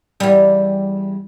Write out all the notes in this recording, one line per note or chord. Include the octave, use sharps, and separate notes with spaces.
E2 G3